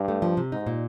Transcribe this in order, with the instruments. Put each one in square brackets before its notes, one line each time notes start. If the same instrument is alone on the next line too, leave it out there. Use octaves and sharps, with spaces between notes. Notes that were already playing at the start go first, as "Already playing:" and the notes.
Already playing: [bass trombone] G2
[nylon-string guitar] A3
F3
C3
[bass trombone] G#2 [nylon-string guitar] D#4
[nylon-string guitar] A#2